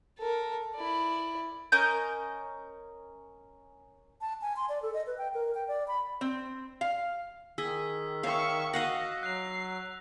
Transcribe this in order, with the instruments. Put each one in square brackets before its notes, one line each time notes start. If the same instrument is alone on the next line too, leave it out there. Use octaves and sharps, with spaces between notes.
[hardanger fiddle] A4 A#4
E4 D5
[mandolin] C#4 A#4 D#5 G6
[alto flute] A5
G#5
C6
D5
A4
D#5
B4
G5
A#4
G5
D5
B5
[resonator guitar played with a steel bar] C4
F5
[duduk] D#3 [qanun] G#4 [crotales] E6 B6
[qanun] C#5 F5 [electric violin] E5 C#6
[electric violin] F#4 [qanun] D#5 F5 F#5 [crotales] A#6
[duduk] F#3 [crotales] F#6 F7 [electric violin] C7